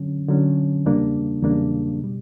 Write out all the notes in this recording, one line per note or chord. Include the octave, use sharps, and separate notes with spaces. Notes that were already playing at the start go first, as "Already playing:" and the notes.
Already playing: D3 F#3 C#4
D3 F#3 C#4
E2 C#3 G3 A#3 D4
E2 C#3 G3 A#3 D4
B2 G3